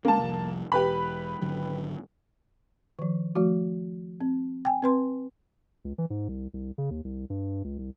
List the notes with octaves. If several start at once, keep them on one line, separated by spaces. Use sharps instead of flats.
G#3 A#3 C#4 A5
F1 C2 F3
E1 G4 B4 B5
G#1 D3 F#3
D#3 F3
F3 A3 F#4
C4
G5 G#5
C4 B4 C6
C#2
E3
G#2
C2
C2
C#3
D#2
C2
G2
C#2
C2